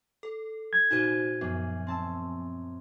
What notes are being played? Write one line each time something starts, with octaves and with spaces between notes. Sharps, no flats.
A4
G#6
A#2 D#4 F#4 C5
F#2 F3 B3
C4 A5 E6